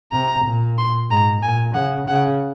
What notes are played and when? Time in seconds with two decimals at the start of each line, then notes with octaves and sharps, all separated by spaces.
0.12 C3 A#5
0.45 A#2
0.78 C6
1.10 G#2 A#5
1.43 A#2 G#5
1.75 C#3 F#5
2.08 C#3 F#5